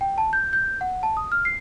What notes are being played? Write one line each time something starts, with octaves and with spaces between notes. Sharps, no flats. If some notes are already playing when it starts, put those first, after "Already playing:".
G5
A5
G6
G6
F#5
A5
D#6
F6
C7